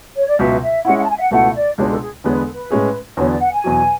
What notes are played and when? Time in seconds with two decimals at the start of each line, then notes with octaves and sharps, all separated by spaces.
0.17 C#5
0.27 D5
0.38 C#2 B2 F#3 E5
0.62 E5
0.85 G#3 C#4 E4 F#5
0.97 F#5
1.02 A5
1.09 G#5
1.15 E5
1.20 F#5
1.31 C#2 B2 A3 E4 F#5
1.55 D5
1.78 C#2 B2 G#3 D4 C#5
1.90 A4
2.01 G#4
2.24 E2 D3 G#3 B3 C#5
2.33 B4
2.43 A4
2.53 B4
2.71 A2 G#3 C#4 G#4
3.17 E2 D3 F#3 B3 C#5
3.28 D5
3.40 F#5
3.52 G#5
3.64 E2 B2 F#3